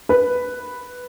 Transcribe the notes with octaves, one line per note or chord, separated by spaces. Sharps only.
B4